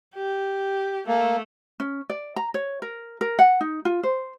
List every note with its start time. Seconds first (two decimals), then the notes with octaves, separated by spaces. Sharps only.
0.15 G4
1.07 A3 A#3
1.80 C#4
2.10 D5
2.36 A#5
2.54 C#5
2.82 A#4
3.21 A#4
3.39 F#5
3.61 D#4
3.85 F4
4.03 C5